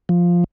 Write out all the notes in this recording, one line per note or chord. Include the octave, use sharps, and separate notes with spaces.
F3